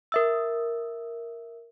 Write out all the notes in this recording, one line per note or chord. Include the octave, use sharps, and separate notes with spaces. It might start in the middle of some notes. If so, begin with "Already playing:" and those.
A#4 E5 E6